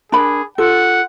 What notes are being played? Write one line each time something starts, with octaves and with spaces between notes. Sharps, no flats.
D4 G#4 A#4 B5
F4 A4 F#5